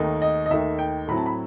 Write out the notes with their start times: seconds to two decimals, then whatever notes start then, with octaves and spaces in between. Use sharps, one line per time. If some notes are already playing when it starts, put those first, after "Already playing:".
Already playing: D#2 D#3 A3 D#4
0.22 D#5
0.46 D#5
0.50 D#2 D#3 A3 D#4 E5
0.79 G5
1.08 A2 F#3 C4 E4 B5
1.17 A5
1.26 B5